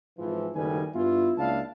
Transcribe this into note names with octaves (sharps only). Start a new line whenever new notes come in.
G#1 E3 F3
F#1 D#3 G3 A3 B4 G#5
G2 B3 E4 F4
C#2 A#3 D4 E4 F5 A5